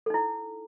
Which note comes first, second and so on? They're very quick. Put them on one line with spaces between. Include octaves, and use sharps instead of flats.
A4 D#4 E4